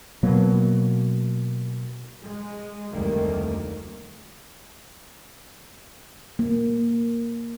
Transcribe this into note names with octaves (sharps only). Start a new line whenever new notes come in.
B2 F#3 A#3
G#3
F1 D2 D#3 G3 A#3
A#3